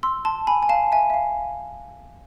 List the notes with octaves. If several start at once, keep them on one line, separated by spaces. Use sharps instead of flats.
C6 E6
A5 C6
G#5 B5
G#5
F5 A5
E5 G#5
E5
F5